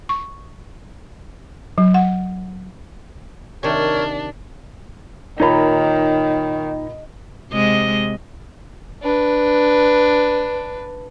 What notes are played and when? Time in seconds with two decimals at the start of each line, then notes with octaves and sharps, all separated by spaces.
0.09 C#6
1.78 F#3
1.94 F#5
3.63 C3 D#3 D4 A#4 C#5
5.40 A#2 D#3 D#4 A#4 C#5 A#5 B5
7.51 C3 G#3 D#5
9.02 D4 B4